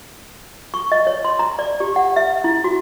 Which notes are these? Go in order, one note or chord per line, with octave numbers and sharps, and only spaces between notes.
C#6
D#5
C#5
C6
A#5
D5
G4
F#5
E5
E4
F#4